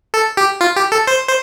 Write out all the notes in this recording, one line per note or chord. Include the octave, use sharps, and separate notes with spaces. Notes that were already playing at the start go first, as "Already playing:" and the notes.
A4
G4
F4
G4
A4
C5
C5